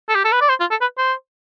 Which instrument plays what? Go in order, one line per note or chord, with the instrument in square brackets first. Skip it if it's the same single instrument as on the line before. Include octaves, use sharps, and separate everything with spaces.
[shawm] A4
G4
A4
B4
D5
C5
F4
A4
B4
C5